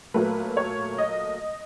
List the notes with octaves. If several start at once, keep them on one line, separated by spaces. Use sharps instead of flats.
A#2 F#3 A3 B4
C#5
D#5